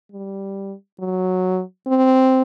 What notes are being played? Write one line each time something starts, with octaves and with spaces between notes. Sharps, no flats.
G3
F#3
C4